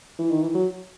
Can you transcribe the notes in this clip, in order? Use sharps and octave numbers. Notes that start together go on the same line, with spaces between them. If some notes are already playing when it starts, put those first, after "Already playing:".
E3
D#3
E3
F#3